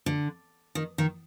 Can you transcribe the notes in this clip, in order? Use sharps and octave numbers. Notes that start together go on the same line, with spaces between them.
D3
D#3
D#3